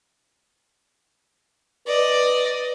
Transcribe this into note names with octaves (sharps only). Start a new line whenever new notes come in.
B4 D5 D#5